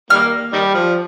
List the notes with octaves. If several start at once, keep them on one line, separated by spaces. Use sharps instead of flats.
D#3 G3 A#3 F6
D#3 G3
F3